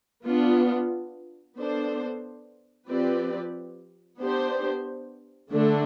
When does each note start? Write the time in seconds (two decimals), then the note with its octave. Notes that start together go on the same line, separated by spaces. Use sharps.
0.24 B3 D4 F4
1.56 B3 D4 A4 C5
2.88 F3 C4 G4 B4 D5
4.19 B3 D4 G4 C5
5.51 D3 A3 D4 A4